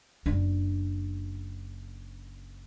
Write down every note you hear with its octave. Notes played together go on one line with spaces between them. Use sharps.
F#1 D4